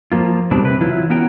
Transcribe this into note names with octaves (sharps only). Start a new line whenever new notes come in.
F3 G3 A#3 F4
B2 D#3 G3 C4 D4
C3 B4
E3 F#3 E4 F4
B3 C#4 F#4 A#4 G5